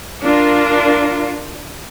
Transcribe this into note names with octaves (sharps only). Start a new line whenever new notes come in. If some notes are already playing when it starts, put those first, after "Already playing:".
D4 F4 A#4